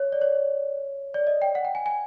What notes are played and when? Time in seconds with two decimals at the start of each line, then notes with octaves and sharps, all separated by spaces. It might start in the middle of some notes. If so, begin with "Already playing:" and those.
Already playing: C#5
0.12 D5
0.21 C#5
1.14 D5
1.27 D#5
1.42 G5
1.55 F#5
1.65 G5
1.75 G#5
1.86 G#5